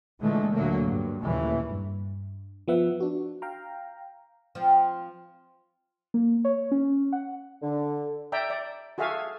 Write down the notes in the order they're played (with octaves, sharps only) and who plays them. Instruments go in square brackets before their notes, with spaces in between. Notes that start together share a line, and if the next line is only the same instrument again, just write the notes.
[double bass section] A#2 D3 E3 G#3 A3
D2 A#2 D3 F#3 A3 A#3
G2
D#2 A#2 C#3 E3 A3 A#3
[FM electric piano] G2
F3 B3 E5 F#5
D4 F#4
F5 G5 A#5
[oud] F3 C4
[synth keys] A#3
C#5
C#4
F#5
[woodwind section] D3
[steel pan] D5 E5 G5 A#5
D5
F#4 G#4 A4 E5 F5 G#5